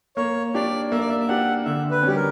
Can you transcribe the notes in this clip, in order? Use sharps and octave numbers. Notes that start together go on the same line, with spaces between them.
A#3 C#5
D4 G4 D5
A#3 E5
D5
E5
E5
D4 G4 F#5
D3 E5
B4
G3 C#4 G4
A#4